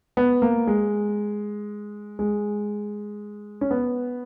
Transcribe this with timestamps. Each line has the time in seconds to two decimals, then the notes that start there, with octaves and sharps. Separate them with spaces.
0.17 B3
0.42 A#3
0.67 G#3
2.19 G#3
3.61 C#4
3.71 B3